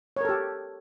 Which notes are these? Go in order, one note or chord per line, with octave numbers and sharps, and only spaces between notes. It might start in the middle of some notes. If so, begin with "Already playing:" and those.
G4 A4 A#4 C#5